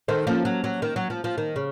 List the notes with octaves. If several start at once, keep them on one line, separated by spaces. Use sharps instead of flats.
D#3 A4 C5
F3 A#3 C#4
F#3
F#3
D#3
F#3
F3
F3
D#3
C#3